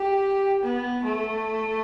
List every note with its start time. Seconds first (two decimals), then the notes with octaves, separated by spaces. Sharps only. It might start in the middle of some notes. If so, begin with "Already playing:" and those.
Already playing: G4
0.63 B3
1.04 A3